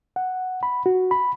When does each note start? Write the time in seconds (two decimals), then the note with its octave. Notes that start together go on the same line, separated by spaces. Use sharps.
0.16 F#5
0.63 B5
0.86 F#4
1.11 B5